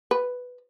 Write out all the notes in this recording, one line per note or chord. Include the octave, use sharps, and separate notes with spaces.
B4